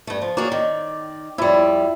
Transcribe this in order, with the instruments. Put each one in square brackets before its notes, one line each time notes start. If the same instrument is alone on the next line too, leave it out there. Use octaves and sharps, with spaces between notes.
[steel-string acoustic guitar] G2 A3
F3
[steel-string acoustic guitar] A#3 F#4 G#4 [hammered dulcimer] D5
[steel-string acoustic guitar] D#3
[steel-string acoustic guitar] F2 G3 [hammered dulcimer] E4